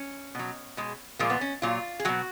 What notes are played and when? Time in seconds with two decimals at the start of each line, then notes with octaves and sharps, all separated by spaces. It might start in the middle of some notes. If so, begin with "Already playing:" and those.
Already playing: C#4
0.35 B2 F#3
0.77 B2 G#3
1.19 A#2 F3 G#3 A#3
1.30 B3
1.41 C#4
1.62 A#2 F#3 F4
2.00 G#4
2.05 B2 F#3 F#4